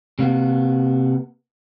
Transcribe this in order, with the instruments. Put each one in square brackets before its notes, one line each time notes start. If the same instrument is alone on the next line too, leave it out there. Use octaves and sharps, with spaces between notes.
[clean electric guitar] C3 A#3 B3